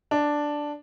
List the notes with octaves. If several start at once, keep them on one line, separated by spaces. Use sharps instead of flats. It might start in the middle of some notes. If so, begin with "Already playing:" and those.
D4